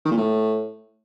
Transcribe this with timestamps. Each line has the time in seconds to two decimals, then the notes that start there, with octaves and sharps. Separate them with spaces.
0.05 D#3
0.11 A#2
0.17 A2